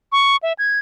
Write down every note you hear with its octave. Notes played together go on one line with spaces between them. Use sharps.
C#6
E5
G#6